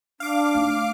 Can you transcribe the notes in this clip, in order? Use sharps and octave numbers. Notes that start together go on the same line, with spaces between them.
D4 F5 D6
A3 D#4